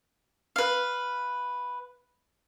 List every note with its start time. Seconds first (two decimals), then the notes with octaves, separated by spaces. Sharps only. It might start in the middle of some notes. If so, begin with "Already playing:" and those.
0.56 B4 F5